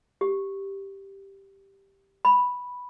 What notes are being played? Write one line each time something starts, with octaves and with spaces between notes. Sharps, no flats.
G4
B5